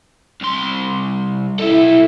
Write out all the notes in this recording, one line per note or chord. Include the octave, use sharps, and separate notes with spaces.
C2 C6
B1 E4 A4